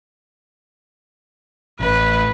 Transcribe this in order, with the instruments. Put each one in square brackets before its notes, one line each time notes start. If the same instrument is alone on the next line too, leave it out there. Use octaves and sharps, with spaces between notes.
[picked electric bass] A1 [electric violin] B4